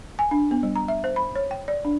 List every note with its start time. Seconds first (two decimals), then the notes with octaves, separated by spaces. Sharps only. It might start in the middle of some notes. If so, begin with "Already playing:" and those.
0.19 G#5
0.31 D4
0.51 B3
0.63 G3
0.76 A#5
0.88 E5
1.04 C5
1.16 B5
1.35 C#5
1.51 G5
1.68 D5
1.85 D4